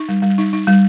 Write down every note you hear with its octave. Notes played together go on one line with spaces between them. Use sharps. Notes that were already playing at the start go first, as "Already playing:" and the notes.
Already playing: D#4
G3
G3
D#4
D#4
G3